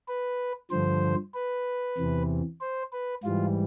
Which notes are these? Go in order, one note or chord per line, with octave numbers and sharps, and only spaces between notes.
B4
G2 D3 F3 C5
B4
E2 C3 E3
C5
B4
G#2 E3 G3 F4